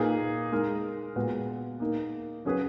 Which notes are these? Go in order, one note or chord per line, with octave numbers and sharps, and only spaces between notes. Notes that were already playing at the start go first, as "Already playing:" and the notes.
Already playing: A#2 A#3 D#4 G#4 B4
G#3 D#4 A#4
A#2 G#3 B3 F#4 B4
A#3 D#4 A#4
F#3 C#4 G#4 B4